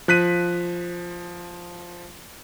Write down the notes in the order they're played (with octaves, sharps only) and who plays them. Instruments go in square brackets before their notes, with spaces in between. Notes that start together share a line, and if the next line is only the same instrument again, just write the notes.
[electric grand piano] F3 F#6 B6 D#7